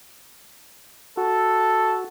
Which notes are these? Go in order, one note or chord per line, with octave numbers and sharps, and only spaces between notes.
F#4 A4